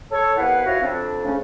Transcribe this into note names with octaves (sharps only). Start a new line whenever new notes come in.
A4 C#5
C2 B3 E4 B4 F5 F#5
F3 E4 F#4 B4 C#5 F5
F2 C4 D4
C#3 A3 C#4